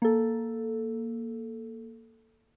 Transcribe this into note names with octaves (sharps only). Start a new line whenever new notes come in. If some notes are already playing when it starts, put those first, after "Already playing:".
A#3 A4